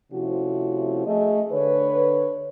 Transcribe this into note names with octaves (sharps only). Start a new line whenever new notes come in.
C3 F3 A3 C#4 E4 F#4
A3 G#4 D#5
D3 B4 C#5